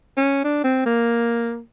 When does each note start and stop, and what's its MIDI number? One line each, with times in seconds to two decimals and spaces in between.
0.17 0.43 61
0.44 0.60 62
0.64 0.85 60
0.86 1.59 58